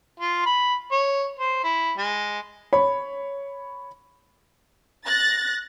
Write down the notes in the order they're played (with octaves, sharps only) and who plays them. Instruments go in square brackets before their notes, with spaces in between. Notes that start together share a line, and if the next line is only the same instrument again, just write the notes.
[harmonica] F4
B5
C#5
C5
E4
G#3
[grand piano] C#5 B5
[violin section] F#6 A6 A#6